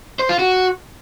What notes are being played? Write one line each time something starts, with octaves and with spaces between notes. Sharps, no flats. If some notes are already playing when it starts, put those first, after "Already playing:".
C5
F4
F#4